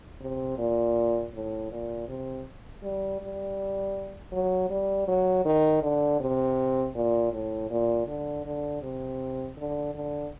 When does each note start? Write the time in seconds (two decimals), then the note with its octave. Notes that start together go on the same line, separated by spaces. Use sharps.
0.21 C3
0.58 A#2
1.34 A2
1.71 A#2
2.08 C3
2.83 G3
3.21 G3
4.32 F#3
4.70 G3
5.08 F#3
5.45 D#3
5.82 D3
6.20 C3
6.95 A#2
7.32 A2
7.71 A#2
8.07 D3
8.45 D3
8.82 C3
9.57 D3
9.94 D3